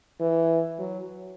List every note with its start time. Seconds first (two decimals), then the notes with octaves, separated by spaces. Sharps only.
0.20 E3
0.79 F#3